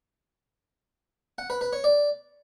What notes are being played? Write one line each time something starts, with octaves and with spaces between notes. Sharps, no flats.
F#5
B4
B4
C#5
D5